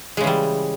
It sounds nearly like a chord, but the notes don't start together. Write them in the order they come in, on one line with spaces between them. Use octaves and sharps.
G#3 C#3 E3 G3